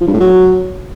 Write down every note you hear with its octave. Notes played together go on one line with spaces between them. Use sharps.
F3
G2
A2
F#3